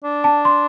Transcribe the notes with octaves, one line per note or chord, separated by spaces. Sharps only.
D4
A5
C6